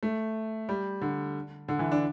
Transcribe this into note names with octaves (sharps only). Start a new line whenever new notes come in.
A3
G3
D3
D3
E3
D4